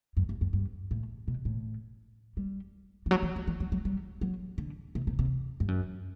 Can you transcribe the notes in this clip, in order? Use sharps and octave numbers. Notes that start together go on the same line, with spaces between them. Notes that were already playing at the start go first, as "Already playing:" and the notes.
F#2
G2
F#2
G2
A2
B2
A2
G3
E3
F#3
E3
F#3
E3
F#3
F#3
G3
F#3
D3
C3
C3
C3
G2
F#2